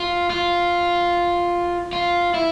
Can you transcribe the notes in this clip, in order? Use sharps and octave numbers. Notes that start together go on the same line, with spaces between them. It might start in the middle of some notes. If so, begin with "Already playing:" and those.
Already playing: F4
F4
F4
E4